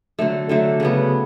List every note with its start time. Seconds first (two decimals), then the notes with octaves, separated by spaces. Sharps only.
0.19 D3 F#3 A3
0.49 D3 F#3 A3
0.80 C#3 F#3 B3